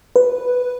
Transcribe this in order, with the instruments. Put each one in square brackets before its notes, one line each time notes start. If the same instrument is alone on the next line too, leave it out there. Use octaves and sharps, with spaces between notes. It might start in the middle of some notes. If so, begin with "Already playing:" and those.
[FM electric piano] B4